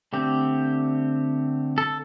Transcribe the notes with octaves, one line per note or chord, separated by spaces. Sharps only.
D3 A3 C4 G4
A4